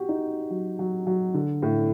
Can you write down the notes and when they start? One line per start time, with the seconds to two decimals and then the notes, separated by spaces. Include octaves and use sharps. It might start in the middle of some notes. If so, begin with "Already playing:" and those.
Already playing: F#4 G4
0.09 D#4
0.50 F#3
0.79 F#3
1.07 F#3
1.34 D3
1.63 A2